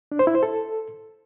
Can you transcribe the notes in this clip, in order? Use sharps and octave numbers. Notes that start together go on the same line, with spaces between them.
D4
C5
E4
C5
A4